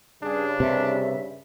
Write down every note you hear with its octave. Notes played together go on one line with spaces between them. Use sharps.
G2 C#3 D4 G#4
C3 E5